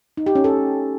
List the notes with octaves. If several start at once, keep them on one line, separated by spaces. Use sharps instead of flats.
D#4
G4
C#4
A4